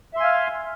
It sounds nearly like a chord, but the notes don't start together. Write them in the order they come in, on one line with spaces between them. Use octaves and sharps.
E5 C6 G#5 F5